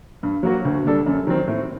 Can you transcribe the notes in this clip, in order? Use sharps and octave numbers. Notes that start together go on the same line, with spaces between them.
G2
F#3 A#3 F#4
D2
D3 G3 D4 A4
F#2
D#3 F#3 C4
A2